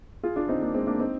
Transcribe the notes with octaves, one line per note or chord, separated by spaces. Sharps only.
F4 G#4
D4 F4
C4 D#4
A#3 D4
G#3 C4
A#3 D4
C4 D#4